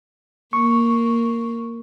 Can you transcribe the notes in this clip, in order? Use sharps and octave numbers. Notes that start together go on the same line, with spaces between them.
A#3 C#6